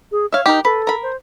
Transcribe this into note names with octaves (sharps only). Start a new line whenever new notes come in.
G#4
C#5 E5 F5
D#4 G4 A#4
A4 B4
A#4 B5
C5